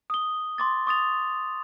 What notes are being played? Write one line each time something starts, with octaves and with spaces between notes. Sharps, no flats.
D#6 G7
C6 D6 A6
C#6 D#6 A6 F7